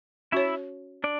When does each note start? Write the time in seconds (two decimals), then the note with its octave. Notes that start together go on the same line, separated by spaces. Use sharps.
0.32 C#4 E4 F#4 C#5 E5
1.04 D4 D5